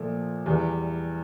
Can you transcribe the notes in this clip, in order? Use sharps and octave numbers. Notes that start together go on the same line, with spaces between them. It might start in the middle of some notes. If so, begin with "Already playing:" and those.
Already playing: A#2 F3 A3 A4
E2 E3 G3